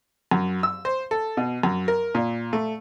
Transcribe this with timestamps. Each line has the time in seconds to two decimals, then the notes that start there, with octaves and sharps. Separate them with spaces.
0.31 F#2
0.63 E6
0.85 C5
1.11 A4
1.37 B2
1.63 F#2
1.88 A#4
2.15 A#2
2.53 A3